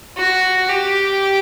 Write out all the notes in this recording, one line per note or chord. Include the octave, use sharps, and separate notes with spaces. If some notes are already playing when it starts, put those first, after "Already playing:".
F#4
G4